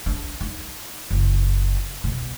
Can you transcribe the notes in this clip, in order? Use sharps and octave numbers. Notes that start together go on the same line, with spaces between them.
D4
D#4
F#1
B2